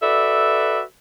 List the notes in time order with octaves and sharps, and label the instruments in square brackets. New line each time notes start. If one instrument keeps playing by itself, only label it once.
[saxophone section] F#4 A4 B4 D5 E5